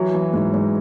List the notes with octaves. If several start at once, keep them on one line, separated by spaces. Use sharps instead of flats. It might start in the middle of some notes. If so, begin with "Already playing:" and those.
Already playing: E3 F#3
E3
G#2
G#2